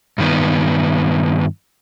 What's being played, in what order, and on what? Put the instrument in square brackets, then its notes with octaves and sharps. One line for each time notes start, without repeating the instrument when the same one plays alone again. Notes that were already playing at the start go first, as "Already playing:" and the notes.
[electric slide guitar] G2 D#3 B3